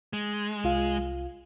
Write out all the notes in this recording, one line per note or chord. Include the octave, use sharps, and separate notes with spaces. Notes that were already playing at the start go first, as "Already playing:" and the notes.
G#3
C2 F4 F5